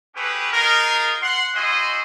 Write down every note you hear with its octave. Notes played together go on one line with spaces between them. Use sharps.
A3 C#4 G4 G#4 B4
D#4 F4 G#4 A#4
F#5 C6
E4 F#4 C5 D#5 G#5 C6